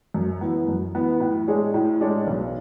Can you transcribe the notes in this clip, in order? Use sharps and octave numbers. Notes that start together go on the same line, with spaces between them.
F#2
E3 B3
F#2
E3 B3
A2
G#3 D4 G#4 C#5
A2
G#3 D4 G#4 C#5
B1